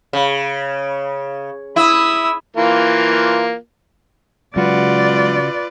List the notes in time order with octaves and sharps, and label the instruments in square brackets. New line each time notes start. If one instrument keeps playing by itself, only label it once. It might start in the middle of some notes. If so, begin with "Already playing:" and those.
[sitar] C#3
[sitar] E4 [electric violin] D#6 E6
[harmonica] E3 A#3 F4
[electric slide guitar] C#3 F#4 [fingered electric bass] F#3 G#3 [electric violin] F4 B4 [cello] D5